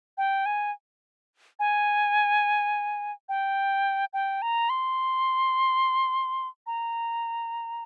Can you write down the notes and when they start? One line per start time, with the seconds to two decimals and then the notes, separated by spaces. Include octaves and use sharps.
0.18 G5
0.46 G#5
1.59 G#5
3.29 G5
4.13 G5
4.42 A#5
4.70 C6
6.67 A#5